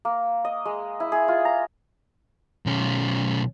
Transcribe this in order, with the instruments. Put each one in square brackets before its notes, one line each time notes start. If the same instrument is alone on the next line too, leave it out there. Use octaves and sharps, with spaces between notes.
[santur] A#3
D#5
G#3
E4
G#4
F4
A#5
[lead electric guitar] B1 C#4